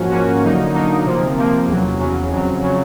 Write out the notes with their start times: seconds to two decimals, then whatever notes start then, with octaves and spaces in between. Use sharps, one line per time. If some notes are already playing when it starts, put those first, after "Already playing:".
Already playing: G#2 F3 A#3 C#4 F#4
0.11 G#2 F3 A#3 C#4 F#4
0.43 D3 F#3 A#3 D#4
0.73 D3 F#3 A#3 D#4
1.05 C3 F3 A#3
1.37 C3 F3 A#3
1.67 E2 C#3 F#3
1.99 E2 C#3 F#3
2.29 F2 C#3 F#3
2.63 C#3 F#3